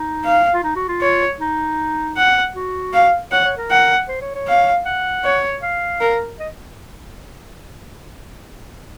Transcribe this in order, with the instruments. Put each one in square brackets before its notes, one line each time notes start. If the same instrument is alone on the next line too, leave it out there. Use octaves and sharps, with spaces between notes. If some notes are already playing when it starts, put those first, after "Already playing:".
Already playing: [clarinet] D#4
[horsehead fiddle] F5
[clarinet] F4
D#4
F#4
F4
[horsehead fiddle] C#5
[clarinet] D#4
[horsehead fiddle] F#5
[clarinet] F#4
[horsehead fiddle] F5
[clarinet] C#5 [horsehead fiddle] F#5
[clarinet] C#5
A#4
[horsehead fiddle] F#5
[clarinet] C5
C#5
C#5
[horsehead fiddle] F5
[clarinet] F#5
[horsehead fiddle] C#5
[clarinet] F5
[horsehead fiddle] A#4
[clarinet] D#5